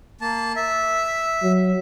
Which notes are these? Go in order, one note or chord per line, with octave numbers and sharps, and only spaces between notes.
A#3 A5
E5
F#3